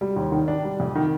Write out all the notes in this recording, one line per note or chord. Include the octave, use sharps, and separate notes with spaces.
G3
D#2
D#3
D4
G3
F2
D#3